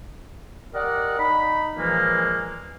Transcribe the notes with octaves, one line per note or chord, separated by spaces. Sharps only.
G4 A#4 D5 D#5 F#5
D#4 B5
A#2 E3 F3 G#3 A#3